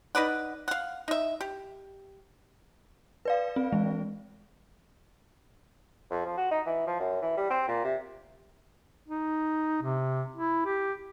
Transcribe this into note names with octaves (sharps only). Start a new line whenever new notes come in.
D#4 B4 D5 F#5
F5 F#5
D#4 E5
G4
B4 D5 F5
C4
E3 G#3
F2
F3
F#4
D#4
E3
F3
F#2
E3
G3
C4
A#2
C3
D#4
C3
E4
G4